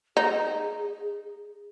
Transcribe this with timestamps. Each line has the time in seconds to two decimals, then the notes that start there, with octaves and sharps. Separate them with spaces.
0.17 D#4 G#4